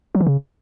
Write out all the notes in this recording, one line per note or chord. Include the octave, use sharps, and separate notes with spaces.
F#3
E3
C#3